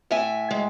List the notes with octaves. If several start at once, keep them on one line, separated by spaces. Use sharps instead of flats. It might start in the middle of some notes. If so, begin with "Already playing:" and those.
A2 E5 G#5
G#3